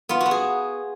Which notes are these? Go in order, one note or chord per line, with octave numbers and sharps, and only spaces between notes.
B3 F4
F#4
B3
G#4